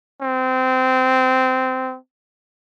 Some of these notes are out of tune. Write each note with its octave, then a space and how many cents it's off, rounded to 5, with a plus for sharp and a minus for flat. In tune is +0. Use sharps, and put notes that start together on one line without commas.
C4 -20